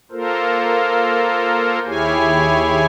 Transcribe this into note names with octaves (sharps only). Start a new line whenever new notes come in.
A#3 F4 A4 A#4 C5
D#2 E4 G4 G#4 C#5 G#5